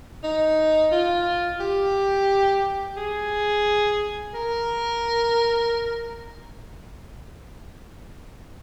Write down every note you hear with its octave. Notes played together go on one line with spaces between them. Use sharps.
D#4
F4
G4
G#4
A#4